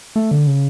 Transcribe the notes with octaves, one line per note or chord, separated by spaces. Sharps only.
A3
D3
C#3